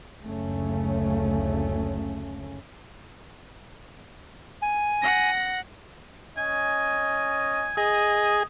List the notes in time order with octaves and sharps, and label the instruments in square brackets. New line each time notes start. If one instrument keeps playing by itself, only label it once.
[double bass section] F#1 D2 C#3 A3 C#4
[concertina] G#5
[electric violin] F#5 A#6
[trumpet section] C#4 D#5 [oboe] G#5
[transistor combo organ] G#4 [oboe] D#5 [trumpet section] D#6